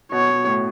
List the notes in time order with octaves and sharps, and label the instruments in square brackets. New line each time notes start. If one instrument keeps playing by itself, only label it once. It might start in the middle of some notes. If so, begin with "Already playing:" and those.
[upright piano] B2 [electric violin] C#5
[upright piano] B2
A2